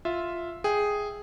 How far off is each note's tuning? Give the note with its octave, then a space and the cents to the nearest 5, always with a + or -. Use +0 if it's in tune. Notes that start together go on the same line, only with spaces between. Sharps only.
F4 +0 E5 +0
G#4 +0 E5 +0 G5 +0